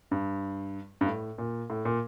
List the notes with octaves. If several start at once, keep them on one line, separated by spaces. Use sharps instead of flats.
G2
G2
A2
A#2
A2
A#2